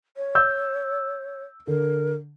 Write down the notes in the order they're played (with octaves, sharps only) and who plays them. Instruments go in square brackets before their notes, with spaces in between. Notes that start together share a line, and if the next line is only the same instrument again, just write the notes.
[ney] C#5
[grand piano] E6 G6
[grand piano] D3 [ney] A#4